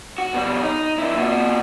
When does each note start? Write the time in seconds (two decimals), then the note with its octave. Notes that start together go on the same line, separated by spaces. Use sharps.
0.18 F#4
0.34 B2 G3
0.62 D#4
0.98 D3 E4
1.15 A#2 F#4